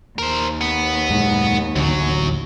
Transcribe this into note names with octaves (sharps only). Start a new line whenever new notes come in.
D#2 A#4 C5
B3
F#2 A#2 G#3
D1 A1 F#2 D3 F#3